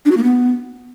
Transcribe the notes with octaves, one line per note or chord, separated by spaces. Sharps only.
D4
F#4
A#3
B3